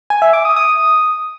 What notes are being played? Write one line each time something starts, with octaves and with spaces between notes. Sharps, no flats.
G#5
E5
D6
D#6
D#6